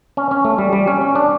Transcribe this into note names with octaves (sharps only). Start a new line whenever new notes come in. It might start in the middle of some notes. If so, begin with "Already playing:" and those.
C#4
C#4
A3
G3
G3
C#4
C#4
D4